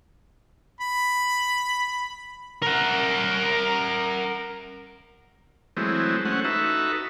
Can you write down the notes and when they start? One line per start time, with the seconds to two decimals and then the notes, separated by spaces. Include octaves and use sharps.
0.81 B5
2.63 A#4 F#5
5.77 E3 F#3 G#3 A3 C4
6.25 A3 C#4 C5 F#5
6.44 D#4 F#4 A4 B4 E5